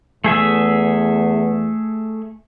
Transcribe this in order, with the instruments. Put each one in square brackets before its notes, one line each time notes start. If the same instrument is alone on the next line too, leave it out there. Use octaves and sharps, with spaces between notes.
[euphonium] E2 [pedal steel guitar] A3 G#4 E5